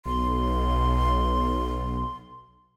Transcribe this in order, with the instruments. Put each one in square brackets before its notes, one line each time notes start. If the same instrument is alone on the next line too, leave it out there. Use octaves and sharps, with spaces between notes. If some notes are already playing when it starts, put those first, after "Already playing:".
[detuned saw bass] B1 [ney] C6